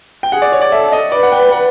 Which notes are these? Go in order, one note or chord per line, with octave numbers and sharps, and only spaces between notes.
G5
G#4 F#5
D5
C#5
D5
A4 E5
D#5
B4 D5
F#5
G5
G5
F#5